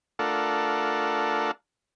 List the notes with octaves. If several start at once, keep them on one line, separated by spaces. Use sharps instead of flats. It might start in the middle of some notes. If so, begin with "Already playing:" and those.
A3 D4 F4 A4 A#4 F#5